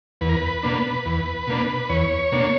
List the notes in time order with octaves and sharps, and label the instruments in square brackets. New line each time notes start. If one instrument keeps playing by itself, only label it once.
[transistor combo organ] E2 B4
A#4
B4
B2 A#3 D4
E2
B2 A#3 D4
E2 C#5
B2 A#3 D4